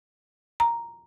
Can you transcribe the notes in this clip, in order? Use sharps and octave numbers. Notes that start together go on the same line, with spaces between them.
A#5